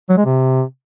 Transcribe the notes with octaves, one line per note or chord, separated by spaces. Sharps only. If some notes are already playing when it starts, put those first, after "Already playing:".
F#3
G#3
C3